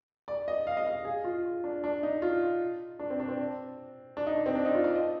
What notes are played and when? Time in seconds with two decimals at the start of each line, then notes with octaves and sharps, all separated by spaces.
0.28 D5
0.48 D#5
0.67 F5
0.77 D#5
0.87 F5
1.05 G#4
1.24 F4
1.64 D4
1.84 D4
2.03 D#4
2.22 F4
2.99 D4
3.10 C4
3.20 D4
3.29 C4
4.17 D4
4.27 D#4
4.36 D4
4.46 C4
4.55 D4
4.65 D#4
4.75 F4
4.84 D5
4.95 D#5